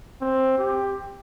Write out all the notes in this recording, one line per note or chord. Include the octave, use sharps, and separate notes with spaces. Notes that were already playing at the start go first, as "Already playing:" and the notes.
C4
G4